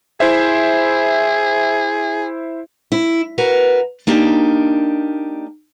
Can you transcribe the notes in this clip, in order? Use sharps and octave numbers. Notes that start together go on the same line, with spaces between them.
E4 G#4 C5 E5
E4
F#4 A#4 B4
A#3 D4 D#4 G4